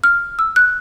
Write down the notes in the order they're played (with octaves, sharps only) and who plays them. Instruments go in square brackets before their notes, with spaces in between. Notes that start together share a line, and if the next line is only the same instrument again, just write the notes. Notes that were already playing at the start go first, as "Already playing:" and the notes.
[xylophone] F6
E6
F#6